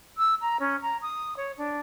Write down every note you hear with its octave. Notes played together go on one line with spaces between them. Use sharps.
E6
A#5
C#4
A#5
D#6
C#5
D4